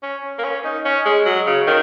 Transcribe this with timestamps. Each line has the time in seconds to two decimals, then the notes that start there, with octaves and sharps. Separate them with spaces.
0.03 C#4
0.38 A#3
0.44 C#4
0.65 D#4
0.85 C#4
1.05 G#3
1.26 F#3
1.46 C#3
1.67 D#3